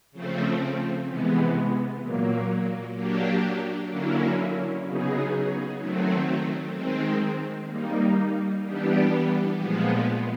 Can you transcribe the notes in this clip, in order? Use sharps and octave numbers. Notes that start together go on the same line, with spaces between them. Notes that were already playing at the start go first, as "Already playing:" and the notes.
C#3 F3 A3 C4
C3 E3 G#3 B3
A#2 F#3 A#3
F#3 A#3 D4 G4
D3 F#3 A#3 C#4 E4
C#3 F#3 B3 D#4 G#4
D#3 F#3 A3 C4
D#3 G#3 C4
G3 A#3 D#4
E3 G3 B3 D4 G4
A#2 F3 G#3 B3